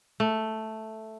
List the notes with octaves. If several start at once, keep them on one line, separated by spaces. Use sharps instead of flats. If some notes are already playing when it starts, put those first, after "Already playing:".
A3